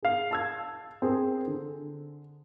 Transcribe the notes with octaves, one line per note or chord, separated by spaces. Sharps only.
G#4 F5
A5 E6 G#6
C4 G#4 A#4
D3